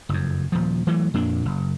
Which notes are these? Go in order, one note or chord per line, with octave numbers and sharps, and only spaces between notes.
F#1 F2
D#1 F3
E3 F#3 A3
F2 A#2 A#3 D4
F#1